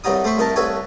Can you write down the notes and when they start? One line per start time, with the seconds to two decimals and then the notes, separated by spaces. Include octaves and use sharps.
0.04 C2 G2 F#3 D#4 D#6
0.24 A3 C5 B5 C#6
0.38 C2 D#4 A#4 A5
0.56 C2 A4 B4 C#5 G#5